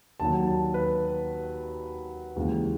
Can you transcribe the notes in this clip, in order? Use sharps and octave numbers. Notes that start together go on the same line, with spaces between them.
D#2 D#3 F#3 A5
A5
B4
D#2 C#3 E3 G#3